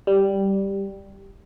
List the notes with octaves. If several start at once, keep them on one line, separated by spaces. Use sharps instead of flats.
G3